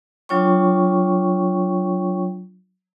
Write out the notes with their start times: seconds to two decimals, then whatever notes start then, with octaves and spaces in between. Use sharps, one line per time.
0.29 F#3 D4 F4 C#5 G5 C#6